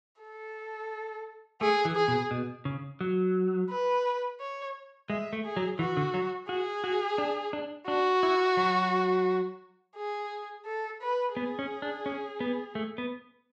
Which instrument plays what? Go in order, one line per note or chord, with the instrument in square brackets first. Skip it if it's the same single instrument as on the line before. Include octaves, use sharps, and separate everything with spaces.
[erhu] A4
[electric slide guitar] A3 [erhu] G#4
[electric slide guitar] E3
[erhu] G#4
[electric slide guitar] B2
B2
C#3
F#3
[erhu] B4
C#5
[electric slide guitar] G#3 [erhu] E5
[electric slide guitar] A3
[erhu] G#4
[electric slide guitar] F#3
[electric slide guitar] E3 [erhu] F#4
[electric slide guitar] D3
F#3
[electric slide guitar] F#4 [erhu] G#4
[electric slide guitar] F#4
D4
D4
[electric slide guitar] D4 [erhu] F#4
[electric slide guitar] E4
F#3
[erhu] G#4
A4
B4
[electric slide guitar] B3 [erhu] G#4
[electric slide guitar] C#4
D4
C#4
B3
A3
B3